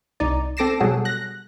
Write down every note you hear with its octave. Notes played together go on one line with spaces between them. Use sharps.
C2 D#4 D5
C4 A4 D6 A#6 C7 E7
B2 F#3 G3 G#4 A4 F#5
F#6 A#6